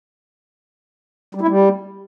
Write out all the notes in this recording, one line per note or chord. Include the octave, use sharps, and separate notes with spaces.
G3
E4
G3